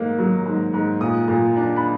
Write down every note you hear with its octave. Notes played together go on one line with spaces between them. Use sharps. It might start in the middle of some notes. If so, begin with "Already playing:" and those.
Already playing: G#2 A#3
F#3
G#2
G#2
A#2 D#6
A#2
D4
B5